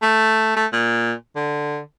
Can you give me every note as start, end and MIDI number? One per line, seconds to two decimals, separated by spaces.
0.02 0.55 57
0.57 0.67 57
0.73 1.13 46
1.36 1.80 50